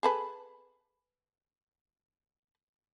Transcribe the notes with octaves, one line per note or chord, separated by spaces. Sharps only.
G#4 A4 B4